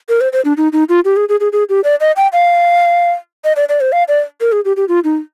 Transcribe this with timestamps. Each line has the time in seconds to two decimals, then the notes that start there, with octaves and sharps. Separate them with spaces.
0.09 A#4
0.21 C5
0.33 C5
0.45 D4
0.57 D#4
0.73 D#4
0.89 F4
1.05 G4
1.17 G#4
1.29 G#4
1.40 G#4
1.53 G#4
1.69 G4
1.84 D5
2.00 D#5
2.17 G5
2.33 F5
3.44 D#5
3.56 D5
3.69 D5
3.81 C5
3.92 F5
4.08 D5
4.41 A#4
4.52 G#4
4.65 G4
4.77 G4
4.89 F4
5.04 D#4